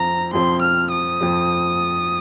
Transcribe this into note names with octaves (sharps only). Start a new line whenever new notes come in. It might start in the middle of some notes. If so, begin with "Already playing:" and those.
Already playing: F2 F3 C4 A#5
F2 F3 C4 C6
F6
D#6
F2 F3 C4